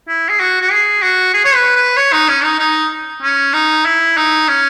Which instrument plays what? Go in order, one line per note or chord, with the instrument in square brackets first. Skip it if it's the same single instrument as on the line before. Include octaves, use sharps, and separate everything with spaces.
[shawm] E4
G#4
F#4
F#4
G#4
F#4
G#4
C#5
B4
B4
C#5
D#4
C#4
D#4
D#4
C#4
D#4
E4
D#4
C#4